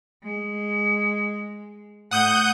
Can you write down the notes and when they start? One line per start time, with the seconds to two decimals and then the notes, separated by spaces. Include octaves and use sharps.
0.23 G#3
2.11 A2 F#5 D#6 G6